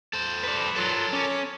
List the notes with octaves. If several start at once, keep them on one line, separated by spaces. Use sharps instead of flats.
A4 C5
B4 D5
F#3 F4 A4 A#4
C#4 D6